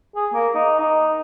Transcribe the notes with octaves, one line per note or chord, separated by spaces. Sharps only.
G#4
A#3
D#4
D#4